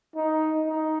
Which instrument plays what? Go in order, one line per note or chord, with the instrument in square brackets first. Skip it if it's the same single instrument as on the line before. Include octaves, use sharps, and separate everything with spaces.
[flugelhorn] D#4
D#4